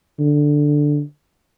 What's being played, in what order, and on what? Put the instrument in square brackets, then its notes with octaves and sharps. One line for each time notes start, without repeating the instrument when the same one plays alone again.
[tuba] D3